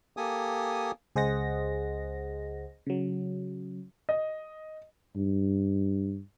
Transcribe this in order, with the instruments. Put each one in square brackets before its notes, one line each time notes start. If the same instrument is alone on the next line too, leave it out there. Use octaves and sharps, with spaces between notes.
[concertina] A#3 G4 A4 G#5 D#6
[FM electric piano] C#2 G#4 C5 D#5 F#5 A#6
C#3 F#3
[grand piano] D#5
[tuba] G2